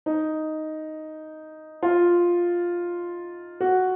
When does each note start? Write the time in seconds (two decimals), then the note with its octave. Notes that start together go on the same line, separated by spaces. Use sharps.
0.06 D#4
1.83 F4
3.61 F#4